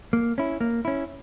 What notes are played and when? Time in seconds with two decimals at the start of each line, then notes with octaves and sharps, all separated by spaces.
0.13 A#3
0.38 C#4 E4
0.61 A#3
0.85 C#4 E4